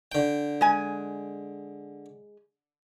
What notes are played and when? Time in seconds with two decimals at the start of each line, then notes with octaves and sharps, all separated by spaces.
0.12 D3 G5
0.61 G#3 G#5